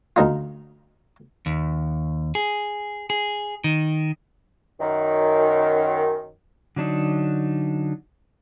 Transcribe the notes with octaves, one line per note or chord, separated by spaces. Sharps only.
D2 D#4 F4
D#2
G#4
G#4
D#3
F#2 D#3
D3 F#3 D4 D#4